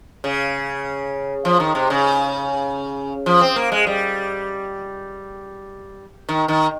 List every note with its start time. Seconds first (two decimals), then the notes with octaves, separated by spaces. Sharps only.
0.24 C#3
1.45 F3
1.60 D#3
1.75 C3
1.90 C#3
3.26 F3
3.41 C4
3.56 A#3
3.72 G#3
3.87 G3
6.29 D#3
6.48 D#3